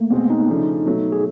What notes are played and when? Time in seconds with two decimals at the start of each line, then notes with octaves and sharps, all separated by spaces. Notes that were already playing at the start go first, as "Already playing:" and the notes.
Already playing: A3 A#3
0.10 B2 G#3 B3 C4
0.30 D#4
0.48 C#3 F3 A3 D4
0.86 B2 F#3 A3
1.12 G#4